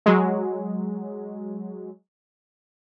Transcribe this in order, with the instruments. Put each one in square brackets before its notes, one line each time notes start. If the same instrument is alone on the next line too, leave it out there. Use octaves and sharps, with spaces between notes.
[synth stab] F#3 G#3